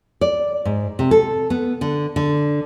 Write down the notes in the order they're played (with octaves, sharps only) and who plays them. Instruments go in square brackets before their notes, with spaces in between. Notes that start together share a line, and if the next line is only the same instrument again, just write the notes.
[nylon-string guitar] D5
G#2
C3
A4
B3
D3
D3